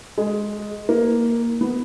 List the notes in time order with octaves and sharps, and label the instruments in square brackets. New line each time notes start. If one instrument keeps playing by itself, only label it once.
[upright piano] G#3
A#3
B3